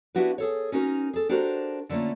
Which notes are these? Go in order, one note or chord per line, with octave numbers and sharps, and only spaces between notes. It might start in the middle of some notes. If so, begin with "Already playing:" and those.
B3 D4 E4 F#4 G4 B4
G#4 A4 C#5
C#4 D#4 F#4 A#4
G#4 A4
D4 F#4 G4 A4 A#4 C5
D3 A3 A#3 C#4 F4